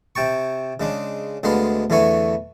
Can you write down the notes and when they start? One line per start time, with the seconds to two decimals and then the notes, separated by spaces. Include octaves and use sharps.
0.15 C3 G5 A5 C#6
0.80 C#3 G#3 D4
1.43 D2 D3 G#3 B3 F5 C6
1.90 E2 D3 E3 A3 G#5 C#6